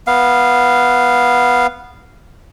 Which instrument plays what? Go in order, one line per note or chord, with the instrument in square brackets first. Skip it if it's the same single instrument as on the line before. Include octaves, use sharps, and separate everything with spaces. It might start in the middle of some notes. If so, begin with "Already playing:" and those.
[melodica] B3 F5